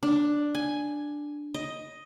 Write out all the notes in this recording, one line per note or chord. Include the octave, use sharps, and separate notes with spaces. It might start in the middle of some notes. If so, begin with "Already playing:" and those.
D4
G#5
D#5